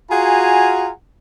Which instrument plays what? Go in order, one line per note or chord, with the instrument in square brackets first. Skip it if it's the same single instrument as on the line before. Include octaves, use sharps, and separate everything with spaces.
[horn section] F4 F#4 G#4 F#5 G#5 A#5